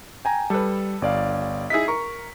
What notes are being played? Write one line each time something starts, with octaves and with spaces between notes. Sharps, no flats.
G5 G#5 A#5
G3 A4 B4
G1 D5 F5
D#4 E4 G#4 B6
A#4 C#6